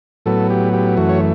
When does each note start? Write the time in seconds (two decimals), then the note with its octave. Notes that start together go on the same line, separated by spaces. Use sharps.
0.26 A2 F#3 B3 A4
0.50 G4
0.73 G4
0.97 F#2 E3 A3 F#4
1.09 C#5